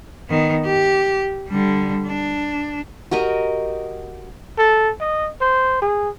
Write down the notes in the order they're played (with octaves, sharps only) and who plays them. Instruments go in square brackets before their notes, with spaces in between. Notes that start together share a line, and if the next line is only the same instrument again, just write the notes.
[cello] D#3 B3
G4
D3 G3
D4
[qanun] F#4 G4 A#4 D#5
[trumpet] A4
D#5
C5
G#4